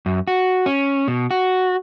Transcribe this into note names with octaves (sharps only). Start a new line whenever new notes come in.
F#2
F#4
C#4
B2
F#4